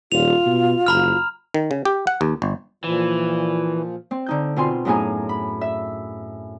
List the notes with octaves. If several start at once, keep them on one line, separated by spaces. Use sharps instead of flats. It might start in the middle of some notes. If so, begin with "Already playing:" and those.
D#1 F4 F7
B2
F#1 A#5 B5 F6
D#3
C#3
G4
F#5
D#2
G1
A#2 E3 F3
C4
D3 D#4 G6
B2 C4 F4 G#5 C6
F#2 A2 B3 D#4 G#4 G#5
B5
E5